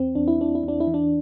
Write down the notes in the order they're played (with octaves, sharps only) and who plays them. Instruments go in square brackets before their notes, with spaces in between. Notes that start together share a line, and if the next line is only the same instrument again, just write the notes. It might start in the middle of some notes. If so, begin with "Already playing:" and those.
Already playing: [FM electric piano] E2 C4
E2 D4
E4
E2 D4
E4
E2 D4
E4
E3
D4